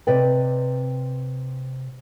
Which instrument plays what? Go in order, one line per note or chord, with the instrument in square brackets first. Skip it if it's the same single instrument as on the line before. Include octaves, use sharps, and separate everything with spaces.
[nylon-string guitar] C3 C4 B4 D5 D#5 G5